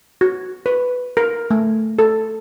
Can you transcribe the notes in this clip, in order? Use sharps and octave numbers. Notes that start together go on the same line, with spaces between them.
F#4
B4
A#4
A3
A4